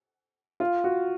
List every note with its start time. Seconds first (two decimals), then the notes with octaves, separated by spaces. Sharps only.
0.60 F4
0.84 F#4